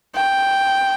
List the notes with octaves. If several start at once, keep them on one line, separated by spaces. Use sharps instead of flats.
G5